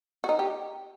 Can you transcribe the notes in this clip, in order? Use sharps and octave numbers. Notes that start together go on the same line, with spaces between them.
F#4
D#4
G4